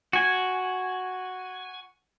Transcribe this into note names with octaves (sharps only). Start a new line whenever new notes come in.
F#4 G#5